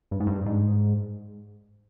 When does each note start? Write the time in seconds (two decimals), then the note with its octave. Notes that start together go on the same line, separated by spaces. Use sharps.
0.11 G2
0.20 G#2
0.27 G2
0.46 G#2